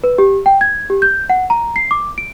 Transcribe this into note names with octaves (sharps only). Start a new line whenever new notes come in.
B4
G4
G5
G#6
G4
G6
F#5
A#5
C7
D6
D7